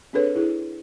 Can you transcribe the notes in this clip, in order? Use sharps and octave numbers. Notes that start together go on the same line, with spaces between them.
C4 D4 G#4 A4 B4 C#5
E4 G#4